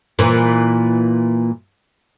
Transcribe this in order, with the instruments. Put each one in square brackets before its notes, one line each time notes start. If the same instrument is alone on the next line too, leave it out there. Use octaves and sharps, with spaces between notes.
[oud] A#2 E3